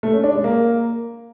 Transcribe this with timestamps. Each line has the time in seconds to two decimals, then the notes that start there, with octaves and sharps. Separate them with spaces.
0.03 A3
0.13 C#4
0.24 D4
0.34 G#3
0.44 A#3